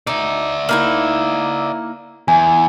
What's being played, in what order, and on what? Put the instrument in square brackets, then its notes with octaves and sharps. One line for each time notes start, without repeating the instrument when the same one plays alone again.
[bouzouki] D#4 [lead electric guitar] D5 E5
[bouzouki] A#3 D#4 E4
[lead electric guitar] E2 [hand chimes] G#5